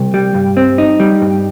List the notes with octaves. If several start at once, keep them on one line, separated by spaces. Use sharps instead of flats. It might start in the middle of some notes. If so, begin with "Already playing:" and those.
Already playing: C2
G3
G2
C4
D#4
G3
G2